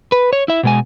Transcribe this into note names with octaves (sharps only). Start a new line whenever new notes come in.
B4
C#5
E4 E5
B2 G#3 G#5